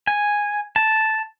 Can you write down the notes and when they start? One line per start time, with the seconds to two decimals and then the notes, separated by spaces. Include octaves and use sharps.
0.07 G#5
0.76 A5